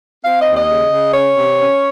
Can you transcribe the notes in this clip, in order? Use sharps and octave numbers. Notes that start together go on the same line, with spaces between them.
C4 F5
D#5
D#2
D#5
C#3
C#3
C#4 C#5
C3
C#4